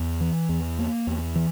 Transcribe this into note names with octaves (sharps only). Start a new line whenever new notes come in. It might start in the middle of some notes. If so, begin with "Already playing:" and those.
Already playing: E2
E3
E2
A#3
E2
E3